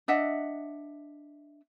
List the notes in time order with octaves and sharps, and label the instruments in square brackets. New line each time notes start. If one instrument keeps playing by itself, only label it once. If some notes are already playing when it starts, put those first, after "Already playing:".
[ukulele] D4 D#5 E5 F#5